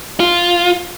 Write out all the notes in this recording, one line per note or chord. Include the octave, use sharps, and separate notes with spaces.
F4